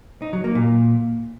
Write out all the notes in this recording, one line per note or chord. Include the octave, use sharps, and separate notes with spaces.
D#4
F#3
A#3
A#2